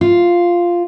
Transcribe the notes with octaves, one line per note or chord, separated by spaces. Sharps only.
F4